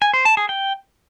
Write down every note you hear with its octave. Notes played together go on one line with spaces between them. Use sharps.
G#5
C5
A5
G#4
G5